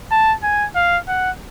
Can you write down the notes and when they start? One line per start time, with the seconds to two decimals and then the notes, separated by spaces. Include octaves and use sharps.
0.11 A5
0.43 G#5
0.75 F5
1.08 F#5